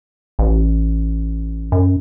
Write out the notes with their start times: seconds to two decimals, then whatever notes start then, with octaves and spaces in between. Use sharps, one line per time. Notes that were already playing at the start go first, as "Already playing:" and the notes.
0.39 A1
1.72 F#2